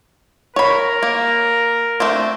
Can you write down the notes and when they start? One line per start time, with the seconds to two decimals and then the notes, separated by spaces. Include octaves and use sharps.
0.56 A#4 C#5 B5
1.03 A#3
2.00 A3 C4 D4